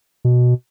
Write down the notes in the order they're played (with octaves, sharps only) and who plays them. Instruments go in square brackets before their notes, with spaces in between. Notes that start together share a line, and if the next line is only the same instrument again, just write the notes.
[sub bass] B2